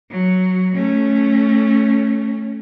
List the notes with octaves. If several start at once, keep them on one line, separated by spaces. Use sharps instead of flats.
F#3
A3 C#4